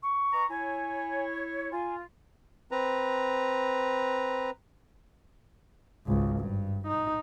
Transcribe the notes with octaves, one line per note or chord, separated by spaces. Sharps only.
C#6
B4 D#5 A#5
E4 C#5 G#5
F4 G#5
C4 B4 A#5
G#1 C#2
G2
D#4